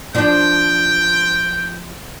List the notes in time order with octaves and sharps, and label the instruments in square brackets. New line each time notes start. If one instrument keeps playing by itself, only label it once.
[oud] F3 D4 [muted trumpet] G5